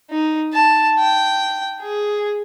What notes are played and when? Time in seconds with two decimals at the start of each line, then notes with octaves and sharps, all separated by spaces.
0.11 D#4
0.54 A5
0.99 G5
1.81 G#4